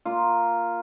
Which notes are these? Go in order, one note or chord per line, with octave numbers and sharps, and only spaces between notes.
A#3 F4